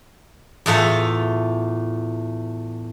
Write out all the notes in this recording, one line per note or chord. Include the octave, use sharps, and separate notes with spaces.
E2 A2 F4 E5